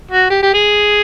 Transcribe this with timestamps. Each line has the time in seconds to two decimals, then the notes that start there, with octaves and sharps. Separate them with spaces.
0.11 F#4
0.30 G4
0.43 G4
0.54 G#4